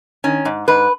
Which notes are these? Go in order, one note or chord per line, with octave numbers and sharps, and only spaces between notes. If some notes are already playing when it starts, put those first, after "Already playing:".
D#3 C#4
G#2
G#2 B4